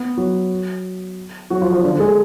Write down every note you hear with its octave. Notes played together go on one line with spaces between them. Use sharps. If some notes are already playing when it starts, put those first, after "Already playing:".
Already playing: B3
F#3 F#4
F#3 F#4
F3 F4
F3 F4
D3 D4
A4
G#3 G#4